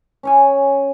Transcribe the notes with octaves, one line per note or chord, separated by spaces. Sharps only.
C#4 C#5 G#5